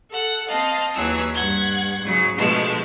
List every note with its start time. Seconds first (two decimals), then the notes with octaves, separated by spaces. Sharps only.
0.11 A4 F#5
0.48 C4 D#5 F5 A5
0.94 D#2 E3 F#3 G#4 E6
1.34 G2 F#5 G#6
2.02 G#2 C#3 F#3
2.37 B2 D3 F3 G#3 A3 B3